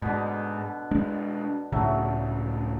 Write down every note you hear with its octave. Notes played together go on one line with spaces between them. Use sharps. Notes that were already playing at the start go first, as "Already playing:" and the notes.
G#2 B2 D3
G#3 D4
C#2 A2 C#3 F#3 A3